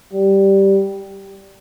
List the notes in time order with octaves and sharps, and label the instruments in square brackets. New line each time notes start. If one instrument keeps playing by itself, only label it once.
[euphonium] G3